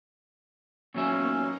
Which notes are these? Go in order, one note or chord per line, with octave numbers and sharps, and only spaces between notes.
A#2 F#3 A#3 B3 C#4 D#4 E5